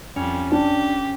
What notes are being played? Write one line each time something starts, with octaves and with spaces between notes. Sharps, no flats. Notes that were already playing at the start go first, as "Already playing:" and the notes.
F2 G3 C#4
D4 G4